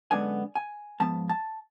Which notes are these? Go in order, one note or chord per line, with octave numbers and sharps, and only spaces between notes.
F#2 D3 G#3 B3 D4 G#5
G#5
G#2 F3 B3 A5
A5